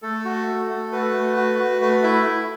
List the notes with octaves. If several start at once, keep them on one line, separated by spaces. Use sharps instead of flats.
A3 A4
F#4
A3
A3
F#4 B4
A3
F#4
F#4
A3 B4
E4 E5
E4